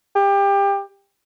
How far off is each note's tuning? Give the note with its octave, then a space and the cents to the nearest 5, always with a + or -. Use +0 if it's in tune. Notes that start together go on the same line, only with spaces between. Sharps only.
G4 +25